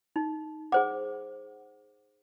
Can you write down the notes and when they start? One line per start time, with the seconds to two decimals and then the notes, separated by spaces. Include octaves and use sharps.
0.16 D#4
0.72 G#4 C5 F#5 D6